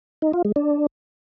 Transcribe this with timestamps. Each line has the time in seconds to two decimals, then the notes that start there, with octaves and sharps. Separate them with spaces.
0.22 D#4
0.33 F4
0.45 G#3
0.56 D4